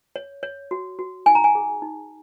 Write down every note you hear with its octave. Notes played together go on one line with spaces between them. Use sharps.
C#5
C#5
F#4
F#4
D#4 G#5
A#5
G#5
G#4
D#4